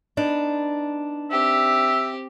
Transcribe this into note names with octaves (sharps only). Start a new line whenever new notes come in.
B3 D4 D#4
C4 G4 E5